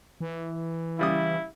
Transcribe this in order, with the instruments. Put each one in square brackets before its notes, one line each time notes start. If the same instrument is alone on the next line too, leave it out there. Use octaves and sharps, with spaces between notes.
[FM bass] E3
[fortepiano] C#3 G3 D#6 [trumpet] E4